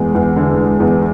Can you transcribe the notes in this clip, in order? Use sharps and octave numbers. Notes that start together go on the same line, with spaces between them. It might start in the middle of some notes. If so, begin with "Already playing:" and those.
Already playing: E2 G#3
E2
D3
G#3
E2